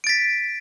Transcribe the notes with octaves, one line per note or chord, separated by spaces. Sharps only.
A6 B6 D7